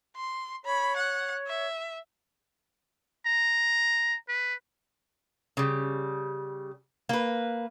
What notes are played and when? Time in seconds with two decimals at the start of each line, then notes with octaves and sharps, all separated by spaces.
0.16 C6
0.65 C#5 B5
0.96 F#5
1.47 E5
3.26 A#5
4.29 B4
5.57 C#3 G3
7.09 A#3 B4